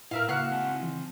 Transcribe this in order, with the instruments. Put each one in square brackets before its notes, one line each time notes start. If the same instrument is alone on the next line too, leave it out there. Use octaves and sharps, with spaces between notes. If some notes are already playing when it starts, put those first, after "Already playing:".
[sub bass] A2 [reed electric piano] E4 [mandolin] A#4 E5 F5
[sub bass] C#3 [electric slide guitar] A#3 [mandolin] F#4 F5 F#6
[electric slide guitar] C4 G#5 A5
[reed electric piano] E3